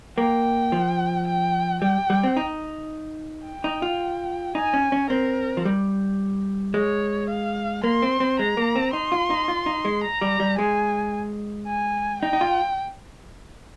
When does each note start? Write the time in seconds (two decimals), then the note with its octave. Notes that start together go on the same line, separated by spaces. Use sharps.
0.18 A#3 G5
0.72 F3
1.27 G5
1.82 G3 G5
2.10 G3
2.23 C4
2.37 D#4
3.46 G5
3.64 D#4
3.82 F4
4.55 D#4 G#5
4.74 C#4
4.92 C#4
5.10 C4 A#4
5.57 F3
5.65 G3
6.74 G#3 C#5
7.29 F5
7.84 A#3 C6
8.02 C4
8.20 C4
8.39 G#3 A#5
8.57 A#3
8.75 C4
8.93 D#4 C6
9.12 F4
9.30 D#4
9.48 F4
9.66 D#4
9.85 G#3
10.04 A#5
10.21 G3
10.40 G3
10.58 G#3 G#5
11.67 G#5
12.22 D#4 G5
12.33 D#4
12.41 F4